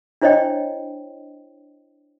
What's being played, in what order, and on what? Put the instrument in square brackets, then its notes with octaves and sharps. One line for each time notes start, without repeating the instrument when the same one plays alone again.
[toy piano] D4 E4 C5 C#5 D#5 G5